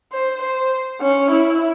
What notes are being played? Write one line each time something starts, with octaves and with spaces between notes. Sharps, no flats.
C5
C5
C#4
E4